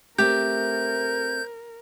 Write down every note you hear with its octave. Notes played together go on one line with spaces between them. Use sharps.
A3 C4 G4 A#4 G6